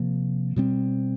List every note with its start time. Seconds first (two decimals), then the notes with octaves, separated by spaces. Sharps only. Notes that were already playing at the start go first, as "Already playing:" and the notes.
Already playing: C3 F3 A#3
0.56 B2 G3 C4